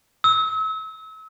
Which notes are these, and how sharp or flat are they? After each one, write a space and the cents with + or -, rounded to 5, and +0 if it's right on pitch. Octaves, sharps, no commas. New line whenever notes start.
E6 -35